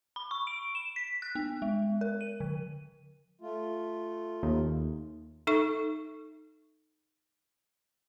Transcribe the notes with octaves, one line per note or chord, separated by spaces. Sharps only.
B5
C#6
D7
E7
B6
F#6
B3
G#3
A#4
D#7
D3
A3 F4
D#2
D#4 A4 E5 C#6